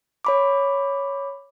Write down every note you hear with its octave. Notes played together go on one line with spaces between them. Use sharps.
C#5 B5 D6